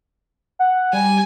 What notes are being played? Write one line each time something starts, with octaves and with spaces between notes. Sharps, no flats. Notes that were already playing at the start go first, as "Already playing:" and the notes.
F#5
G3 G#5